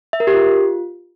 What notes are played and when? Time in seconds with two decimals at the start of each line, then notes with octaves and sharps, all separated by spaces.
0.13 E5
0.20 A#4
0.27 G4
0.34 F4